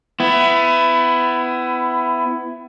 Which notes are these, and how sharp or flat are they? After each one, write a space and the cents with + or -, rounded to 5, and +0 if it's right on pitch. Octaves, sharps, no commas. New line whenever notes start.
B3 +30 E4 +15